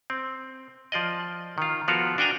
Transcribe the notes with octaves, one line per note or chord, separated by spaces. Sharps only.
C4
F3 F4 D5 D#5
D#3 F4
F3 B3 F4 F#4 A4 A#4
D4 F#4 G5 G#5 A#5